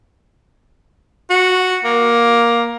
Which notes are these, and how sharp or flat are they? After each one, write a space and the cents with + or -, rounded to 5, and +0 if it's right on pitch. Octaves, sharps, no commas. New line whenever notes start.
F#4 -5
A#3 +10